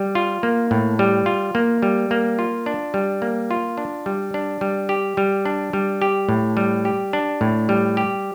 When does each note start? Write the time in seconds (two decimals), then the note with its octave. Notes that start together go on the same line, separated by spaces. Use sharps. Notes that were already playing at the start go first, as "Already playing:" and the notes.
Already playing: G3
0.15 F4
0.43 A#3
0.71 A2
0.99 G3
1.26 F4
1.55 A#3
1.82 G3
2.11 A#3
2.39 F4
2.66 D4
2.94 G3
3.22 A#3
3.51 F4
3.77 D4
4.06 G3
4.34 D4
4.61 G3
4.89 G4
5.17 G3
5.45 D4
5.73 G3
6.02 G4
6.29 A2
6.57 G3
6.85 G4
7.13 D4
7.41 A2
7.69 G3
7.97 G4